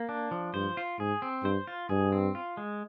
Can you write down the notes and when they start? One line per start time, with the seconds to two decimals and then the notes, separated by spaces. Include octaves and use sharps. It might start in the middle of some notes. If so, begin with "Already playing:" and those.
Already playing: A#3
0.09 D4
0.31 F3
0.54 G2 C5
0.77 F4
0.99 G#2 G#4
1.22 C4
1.44 G2 C5
1.67 F4
1.89 G2 G#4
2.12 C4
2.35 F4
2.57 G#3